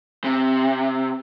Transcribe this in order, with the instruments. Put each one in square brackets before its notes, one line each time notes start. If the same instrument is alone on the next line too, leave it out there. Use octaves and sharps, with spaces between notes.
[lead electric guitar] C3